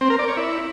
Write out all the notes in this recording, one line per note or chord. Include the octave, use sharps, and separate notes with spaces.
C4
A#4
D5
C#5
E4